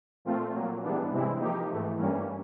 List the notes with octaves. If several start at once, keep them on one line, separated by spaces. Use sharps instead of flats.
A#2 F3 A3 C4 F4
A#2 F#3 A#3
G#2 E3 G3 B3 D4
C3 E3 G#3 C4 E4
F3 A#3 D#4 G4
G#2 E3 A3
G2 E3 G3 A#3 C#4